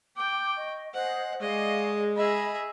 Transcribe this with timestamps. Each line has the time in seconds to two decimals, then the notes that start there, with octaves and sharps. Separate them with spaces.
0.16 G5 D6 G6
0.56 D#5 C#6
0.94 G#4 C5 D#5 F#5
1.41 G#3 D5 D#5 F5 G#5 C#6
2.16 G#4 D#5 E5 B5